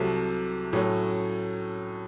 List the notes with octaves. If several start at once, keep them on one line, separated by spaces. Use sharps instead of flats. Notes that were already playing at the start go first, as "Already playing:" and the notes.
Already playing: C2 C3 F#3 A3
A2 F#3 A3 C#4